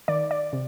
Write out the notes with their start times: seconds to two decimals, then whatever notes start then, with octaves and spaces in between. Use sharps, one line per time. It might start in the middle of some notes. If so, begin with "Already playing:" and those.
0.08 D#3 D5
0.31 D5
0.53 C3